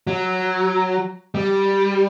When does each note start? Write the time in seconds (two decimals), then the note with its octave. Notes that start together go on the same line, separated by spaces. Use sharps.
0.07 F#3
1.35 G3